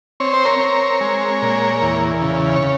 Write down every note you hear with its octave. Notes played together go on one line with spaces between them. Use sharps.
C4 C#5
C5
A#4 C#5
C4
G#3
A#2
E2
C#3
C#5
C#3